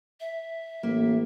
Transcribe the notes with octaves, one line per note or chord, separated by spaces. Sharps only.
E5
A1 A#3